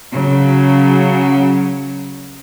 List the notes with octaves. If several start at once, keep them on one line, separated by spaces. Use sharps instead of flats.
C#3 F#3